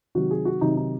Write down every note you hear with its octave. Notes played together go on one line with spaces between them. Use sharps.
C3 D#3 F#3 F#4
G#4
F#4
C3 D#3 F#3 D#4
D#4